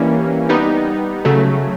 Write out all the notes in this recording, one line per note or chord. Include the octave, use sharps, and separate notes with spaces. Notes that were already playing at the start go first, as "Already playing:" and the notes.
Already playing: E3 G3 A#3 C#4
G3 B3 D#4
C#3 F#3 A3